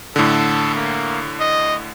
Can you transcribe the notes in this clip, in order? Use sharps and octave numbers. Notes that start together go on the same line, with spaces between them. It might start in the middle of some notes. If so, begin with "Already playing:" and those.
A2 D3 A4
A#3
D#5